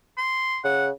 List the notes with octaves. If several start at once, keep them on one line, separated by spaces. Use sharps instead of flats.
C6
C#3 F#5